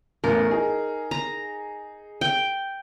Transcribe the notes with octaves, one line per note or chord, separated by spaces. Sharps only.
A1 E2 A2 A#4
D#4 G#4
A#5
G5